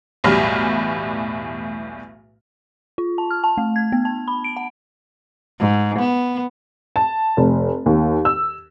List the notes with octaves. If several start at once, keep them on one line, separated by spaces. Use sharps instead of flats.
B1 E2 A2 G3 F6
F4
A5
F6
A5
A3
G#6
B3
A5
B5
D7
F#5
G#2
B3
A5
F1
D#2
E6